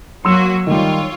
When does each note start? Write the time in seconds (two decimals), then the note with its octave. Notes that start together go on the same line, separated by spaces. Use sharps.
0.25 F#3 A#3 F#4 C6 E6 E7
0.67 D#3 G3 F4 C#5